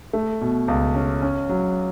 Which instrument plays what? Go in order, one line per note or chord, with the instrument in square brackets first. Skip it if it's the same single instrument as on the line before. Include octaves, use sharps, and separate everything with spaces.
[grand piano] A3
B2
C#2
C#4
C#4
F#3